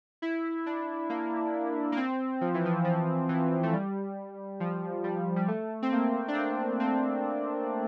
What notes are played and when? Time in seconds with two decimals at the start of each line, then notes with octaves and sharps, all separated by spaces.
0.22 E4
0.66 D4
1.10 A#3
1.92 A#3
1.97 C4
2.41 F3
2.54 E3
2.65 F3
2.85 F3
3.29 E3
3.63 A3
3.73 G3
4.60 F3
5.04 G3
5.36 G3
5.48 A3
5.82 C4
5.92 A#3
6.28 D4
6.35 C4
6.80 C4